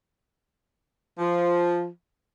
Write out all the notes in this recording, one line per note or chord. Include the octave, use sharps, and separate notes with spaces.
F3